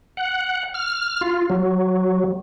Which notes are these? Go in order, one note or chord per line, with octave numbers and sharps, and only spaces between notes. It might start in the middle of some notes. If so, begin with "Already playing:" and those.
F#5
F6
F4
F#3